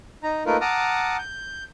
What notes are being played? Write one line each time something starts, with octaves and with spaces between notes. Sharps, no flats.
D#4 A#5
A3 A#3 D#4 F4 A#4 B4
F#5 A5 A#5 D6 D#6 F6
G6